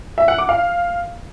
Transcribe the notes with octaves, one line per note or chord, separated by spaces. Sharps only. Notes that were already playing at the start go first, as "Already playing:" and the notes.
E5
F#5
D6
F5